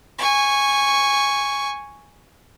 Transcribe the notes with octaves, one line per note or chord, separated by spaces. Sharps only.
G#5 C#6